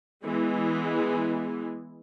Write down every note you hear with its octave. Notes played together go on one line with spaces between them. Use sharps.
E3 G#3 B3